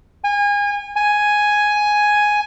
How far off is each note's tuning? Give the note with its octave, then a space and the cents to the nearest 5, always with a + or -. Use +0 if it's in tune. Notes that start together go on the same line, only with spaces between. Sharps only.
G#5 -30
G#5 +5